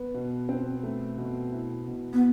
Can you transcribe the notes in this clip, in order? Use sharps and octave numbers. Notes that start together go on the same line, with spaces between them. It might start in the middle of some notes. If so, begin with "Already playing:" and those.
Already playing: B3
B2
C4
A3
B2
E4
B2
B3